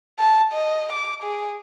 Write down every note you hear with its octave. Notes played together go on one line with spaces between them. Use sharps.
A5
D#5
D6
G#4